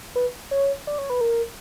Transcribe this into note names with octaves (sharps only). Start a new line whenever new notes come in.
B4
C#5
D5
C#5
B4
A#4